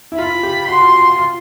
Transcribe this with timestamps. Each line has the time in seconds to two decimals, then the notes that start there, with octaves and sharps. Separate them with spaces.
0.12 E4
0.18 F4 B5
0.43 G4
0.67 F#4 C6
0.81 F4
0.93 F#4
1.18 F4